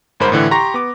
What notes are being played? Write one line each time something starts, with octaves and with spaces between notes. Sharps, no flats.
G1 G#2 A#4 C5 B5
A2 D3 E3
G4 A#5 C6 C#6 A#6
B3 D6